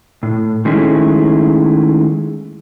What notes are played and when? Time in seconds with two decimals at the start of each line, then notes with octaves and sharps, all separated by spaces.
0.23 A2
0.65 D#3 G#3 A3 C#4 E4